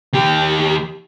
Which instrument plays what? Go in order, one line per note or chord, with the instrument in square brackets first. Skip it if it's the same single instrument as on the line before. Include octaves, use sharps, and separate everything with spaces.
[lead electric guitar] D#2 G4